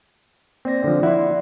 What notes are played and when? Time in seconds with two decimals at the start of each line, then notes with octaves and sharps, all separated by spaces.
0.65 A#3 C4 D5 A#6
0.84 D3 F3
1.03 E4 D5 E5 F#5 C6